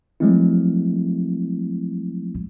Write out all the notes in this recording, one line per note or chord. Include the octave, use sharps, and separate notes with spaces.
F3 F#3 G#3 A3 C4 E4